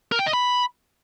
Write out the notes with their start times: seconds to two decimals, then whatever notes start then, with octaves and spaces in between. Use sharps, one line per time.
0.12 A#4
0.19 G5
0.26 D#5
0.33 B5